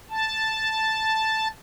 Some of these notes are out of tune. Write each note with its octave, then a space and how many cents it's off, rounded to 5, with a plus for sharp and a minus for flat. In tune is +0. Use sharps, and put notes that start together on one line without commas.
A5 +0